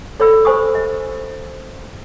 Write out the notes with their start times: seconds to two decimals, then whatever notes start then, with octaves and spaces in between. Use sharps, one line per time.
0.20 A4 C#5 D5 E5 B5 E6
0.45 G4 C5 G#5 C#6 D#6
0.75 D#5